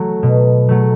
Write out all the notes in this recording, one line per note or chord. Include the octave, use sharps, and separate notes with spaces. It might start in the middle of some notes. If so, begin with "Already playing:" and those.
Already playing: F#3 A3
B2
F#3 A3